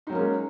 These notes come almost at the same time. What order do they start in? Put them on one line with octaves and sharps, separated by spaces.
D#4 F#3 A#3 C#4 G#3